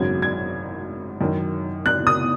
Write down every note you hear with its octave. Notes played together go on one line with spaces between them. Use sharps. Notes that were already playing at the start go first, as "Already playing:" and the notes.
Already playing: G#1 F#2 C#3 F#3 G#6
G#6
F#2 D#3 F#3
F#6
D#6